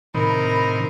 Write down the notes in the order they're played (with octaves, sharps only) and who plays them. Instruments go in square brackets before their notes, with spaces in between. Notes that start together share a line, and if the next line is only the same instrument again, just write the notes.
[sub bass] A2 [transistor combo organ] C3 D#3 [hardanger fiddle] A#4 [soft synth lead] B5